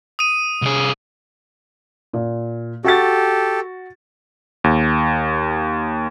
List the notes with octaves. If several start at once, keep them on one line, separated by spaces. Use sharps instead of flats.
D#6 D#7
C2 G#4
A#2
F#4 G4 A4 A6
D#2